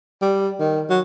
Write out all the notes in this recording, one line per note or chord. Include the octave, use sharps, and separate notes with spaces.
G3
D#3
F#3